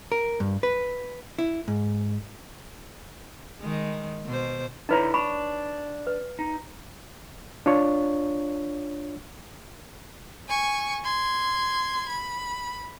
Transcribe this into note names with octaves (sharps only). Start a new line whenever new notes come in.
A#4
G2
B4
E4
G#2
D#3 G#3
B2 C5
D3 D#4 E4 B4 C#5 A#5
D4 B5 C#6
B4
D#4
D4 F4 C#5
G#5 C#6
C6 G#6
B5